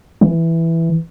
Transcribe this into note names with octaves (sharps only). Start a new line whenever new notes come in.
E3